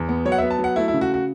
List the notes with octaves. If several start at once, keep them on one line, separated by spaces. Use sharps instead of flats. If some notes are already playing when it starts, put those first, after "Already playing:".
Already playing: E2
B3
F#3 C#5
F#5
B3 E5
A5
F#3
F#5
A3 E4
E4
C#3
F#4
F#4